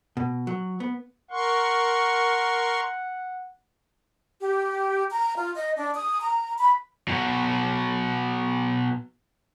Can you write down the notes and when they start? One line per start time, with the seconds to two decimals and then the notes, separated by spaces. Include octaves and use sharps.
0.17 B2
0.47 F#3
0.80 B3
1.31 A#4 F#5 C6 C#6
4.40 G4
5.11 A#5
5.36 F4
5.55 D#5
5.77 D4
5.95 D#6
6.22 A#5
6.58 B5
7.08 B2 F#3